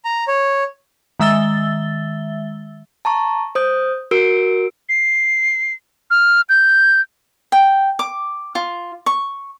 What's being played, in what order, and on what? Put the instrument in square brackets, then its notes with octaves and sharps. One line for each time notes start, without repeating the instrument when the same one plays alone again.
[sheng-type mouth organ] A#5
C#5
[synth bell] D#3 G#3 E5 E6 A6 G7
[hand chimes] A5 A#5 C#6
C5 D#6 G6
F#4 A#4 E6 D7
[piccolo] C7
F6
G6
[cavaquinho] G5
D6
F4
C#6